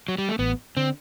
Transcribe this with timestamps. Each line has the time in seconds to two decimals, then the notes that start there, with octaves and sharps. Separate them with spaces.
0.08 F#3
0.18 G3
0.29 A3
0.39 A1 B3
0.77 D3 C4